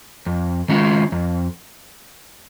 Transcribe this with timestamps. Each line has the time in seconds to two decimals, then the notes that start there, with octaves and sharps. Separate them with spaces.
0.26 F2
0.69 D#3 G#3 C#4 F4
1.12 F2